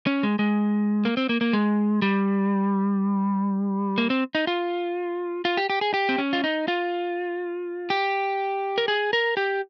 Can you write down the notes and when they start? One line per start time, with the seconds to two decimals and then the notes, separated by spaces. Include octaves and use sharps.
0.07 C#4
0.23 G#3
0.39 G#3
1.05 A#3
1.17 C4
1.29 A#3
1.41 A#3
1.53 G#3
2.02 G3
3.98 A#3
4.10 C4
4.35 D#4
4.47 F4
5.45 F4
5.57 G4
5.70 G4
5.81 G#4
5.94 G4
6.09 C4
6.18 C#4
6.33 F4
6.44 D#4
6.68 F4
7.90 G4
8.78 A#4
8.88 G#4
9.13 A#4
9.37 G4